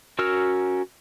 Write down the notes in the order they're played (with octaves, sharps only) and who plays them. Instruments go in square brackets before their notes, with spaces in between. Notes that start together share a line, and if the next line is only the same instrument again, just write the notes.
[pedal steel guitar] C#4 F#4 A#4 E6 F6